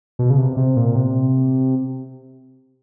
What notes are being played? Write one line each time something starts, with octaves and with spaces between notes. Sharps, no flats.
B2
C#3
C3
C3
A#2
C3